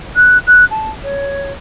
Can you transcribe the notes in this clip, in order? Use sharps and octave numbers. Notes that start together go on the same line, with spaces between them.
F#6
F#6
A5
C#5